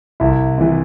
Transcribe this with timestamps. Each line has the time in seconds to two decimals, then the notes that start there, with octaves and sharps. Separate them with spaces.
0.20 C2 E4
0.58 C3 E3